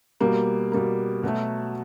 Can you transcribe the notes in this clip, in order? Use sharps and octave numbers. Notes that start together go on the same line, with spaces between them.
B2 G3 A#3
B2 G3 A#3
B2 F#3 A3